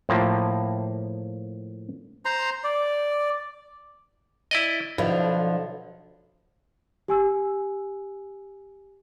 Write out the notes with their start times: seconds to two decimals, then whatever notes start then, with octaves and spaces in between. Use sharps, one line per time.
0.09 A2 F3 A#3
2.25 C5 A#5 C6
2.64 D5
4.51 E4 D5 D#5
4.98 B1 D3 F3 E4
7.08 G4 G#5 E6